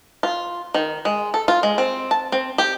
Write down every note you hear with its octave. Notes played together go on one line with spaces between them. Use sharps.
F4
D#3
G#3
A4
F4
G#3
C4
A5
C4
G4